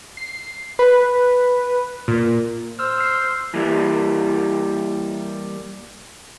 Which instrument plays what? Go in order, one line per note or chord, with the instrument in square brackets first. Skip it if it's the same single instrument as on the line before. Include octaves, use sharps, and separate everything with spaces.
[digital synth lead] C7
B4
A#2
[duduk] C5 [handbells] E6 F6
[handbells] E6 F6 C7
[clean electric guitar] E3 G3 A#3